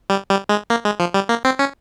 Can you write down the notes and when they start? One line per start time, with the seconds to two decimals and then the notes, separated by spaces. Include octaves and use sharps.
0.10 G3
0.30 G3
0.49 G#3
0.70 A#3
0.85 G#3
1.00 F3
1.14 G3
1.29 A#3
1.45 C4
1.59 C#4